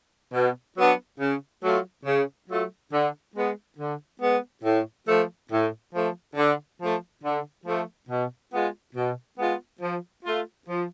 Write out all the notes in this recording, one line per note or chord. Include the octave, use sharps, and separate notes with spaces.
B2
F#3 B3 D4
C#3
F#3 A3 F4
C#3
F#3 A3 F4
D3
G#3 B3
D3
G#3 B3
A2
F3 A3
A2
F3 A3
D3
F3 A3
D3
F3 A3
B2
G#3 B3 F4
B2
G#3 B3 F4
F3
A3 F4
F3